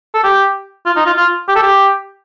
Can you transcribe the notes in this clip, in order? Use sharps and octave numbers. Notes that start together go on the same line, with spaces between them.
A4
G4
F4
D#4
F4
F4
G4
A4
G4